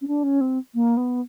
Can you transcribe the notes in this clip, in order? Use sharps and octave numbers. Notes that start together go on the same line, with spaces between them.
C#4
D4
C#4
C4
A#3
B3